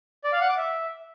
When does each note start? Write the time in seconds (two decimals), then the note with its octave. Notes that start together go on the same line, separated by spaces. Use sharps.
0.24 D5
0.32 F5
0.41 F#5
0.49 D6
0.57 E5